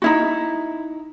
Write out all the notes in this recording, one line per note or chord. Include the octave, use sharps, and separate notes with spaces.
D#4 E4 F#4